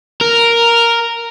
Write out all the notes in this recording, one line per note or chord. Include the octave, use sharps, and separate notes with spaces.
A#4